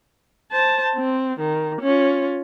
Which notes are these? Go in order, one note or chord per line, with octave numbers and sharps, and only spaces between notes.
C5 A5
C4
D#3
C#4 F4